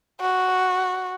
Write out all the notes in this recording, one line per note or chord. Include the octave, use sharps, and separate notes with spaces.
F#4